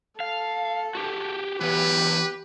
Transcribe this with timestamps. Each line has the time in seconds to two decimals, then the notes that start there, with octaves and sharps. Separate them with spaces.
0.20 A4 F5
0.95 F#4 G4
1.61 E3 F#3 B3 G4 B4